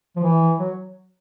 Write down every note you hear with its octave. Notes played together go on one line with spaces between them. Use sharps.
F3
E3
F#3